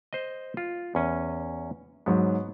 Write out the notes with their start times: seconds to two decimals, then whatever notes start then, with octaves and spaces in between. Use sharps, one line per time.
0.13 C5 D#5
0.57 F4
0.95 E2 C#4 G#5
2.06 G#2 F#3 B3